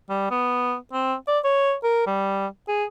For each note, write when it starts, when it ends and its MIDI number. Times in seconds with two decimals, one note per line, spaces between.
0.10 0.26 55
0.31 0.76 59
0.93 1.15 60
1.27 1.39 74
1.45 1.74 73
1.83 2.03 70
2.07 2.47 55
2.68 2.85 68